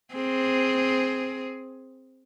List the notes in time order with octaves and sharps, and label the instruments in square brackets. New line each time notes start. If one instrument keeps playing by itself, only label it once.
[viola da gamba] C4 G#4